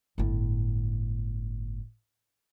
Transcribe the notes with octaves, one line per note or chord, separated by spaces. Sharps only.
G1 A2